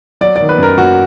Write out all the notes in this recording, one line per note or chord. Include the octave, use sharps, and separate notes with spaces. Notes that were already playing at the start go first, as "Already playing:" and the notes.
F#3 D5
D#3 D5
B4
F#2 A#4
F#2 F#4